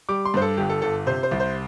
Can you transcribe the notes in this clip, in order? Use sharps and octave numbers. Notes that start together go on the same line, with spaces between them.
G3 D6
C6
G2 C5
A4
G1 G4
A4
G1 A4
C3 C5
C5
C2
C5